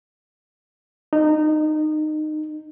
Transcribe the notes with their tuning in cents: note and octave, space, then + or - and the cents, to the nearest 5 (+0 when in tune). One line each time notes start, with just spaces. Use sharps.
D#4 -20